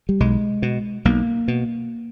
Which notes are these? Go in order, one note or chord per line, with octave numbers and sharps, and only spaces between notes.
G3
B1 G#3
B2
B1 A#3
B2